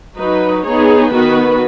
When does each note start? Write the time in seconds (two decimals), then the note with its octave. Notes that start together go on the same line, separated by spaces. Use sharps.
0.17 F#3 D#4 F#4 B4
0.64 B3 D#4 G#4 C#5
1.10 D#3 B3 F#4 B4